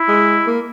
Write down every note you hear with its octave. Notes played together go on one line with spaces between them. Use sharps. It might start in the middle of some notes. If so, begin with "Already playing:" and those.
Already playing: E4
G#3
A#3